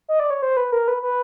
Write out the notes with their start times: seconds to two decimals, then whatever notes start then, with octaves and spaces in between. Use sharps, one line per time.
0.09 D#5
0.20 D5
0.30 C#5
0.42 C5
0.57 B4
0.72 A#4
0.88 B4
1.03 B4